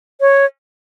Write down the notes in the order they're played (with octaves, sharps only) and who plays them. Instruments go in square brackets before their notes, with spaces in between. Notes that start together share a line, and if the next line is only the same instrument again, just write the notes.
[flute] C#5